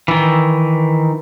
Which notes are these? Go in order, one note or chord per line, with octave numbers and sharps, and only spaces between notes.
D#3 E3